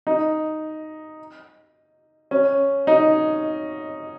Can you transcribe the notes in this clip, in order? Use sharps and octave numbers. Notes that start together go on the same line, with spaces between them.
D#4
C#4
D#4